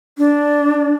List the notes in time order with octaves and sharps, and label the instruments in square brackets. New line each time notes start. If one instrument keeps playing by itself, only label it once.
[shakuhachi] D4